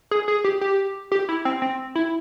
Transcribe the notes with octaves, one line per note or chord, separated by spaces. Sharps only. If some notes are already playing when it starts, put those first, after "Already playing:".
G#4
G#4
G4
G4
G4
E4
C4
C4
E4